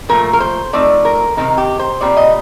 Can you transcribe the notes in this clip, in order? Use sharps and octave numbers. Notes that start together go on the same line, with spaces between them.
A#2 F3 A3 A#4
A#4
C5
F3 A3 C4 D#4 D5
A#4
C3 D#3 A3 C4 D#4 A#4
G4
C5
A#2 G3 C4 D5
D#5